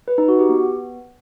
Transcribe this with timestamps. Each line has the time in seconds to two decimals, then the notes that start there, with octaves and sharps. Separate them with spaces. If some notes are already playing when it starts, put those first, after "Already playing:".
0.08 B4
0.18 D#4
0.28 F#4
0.39 G4
0.49 B3